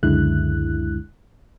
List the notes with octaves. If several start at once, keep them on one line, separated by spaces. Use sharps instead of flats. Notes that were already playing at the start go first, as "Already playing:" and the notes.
C#2 F#2 D3 G#3 E4 F#6